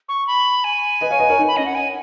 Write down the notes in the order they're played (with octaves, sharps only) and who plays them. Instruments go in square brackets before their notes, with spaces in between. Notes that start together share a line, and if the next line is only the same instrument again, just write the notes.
[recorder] C#6
B5
G#5
[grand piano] B4 D#5
C#5 F5
B4 D#5
A#4 C#5
D#4
[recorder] B5
[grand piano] C#4 [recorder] D#5
[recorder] F#5
G#5